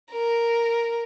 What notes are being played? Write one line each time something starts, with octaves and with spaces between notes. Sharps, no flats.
A#4